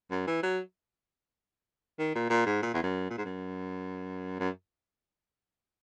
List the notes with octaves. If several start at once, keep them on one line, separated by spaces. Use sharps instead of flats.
F#2
E3
F#3
D#3
A#2
A#2
G#2
A#2
E2
F#2
A#2
G#2
F#2
F#2